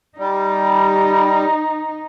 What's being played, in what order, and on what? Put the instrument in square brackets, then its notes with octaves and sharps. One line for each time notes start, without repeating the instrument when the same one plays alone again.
[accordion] G3 [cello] D#4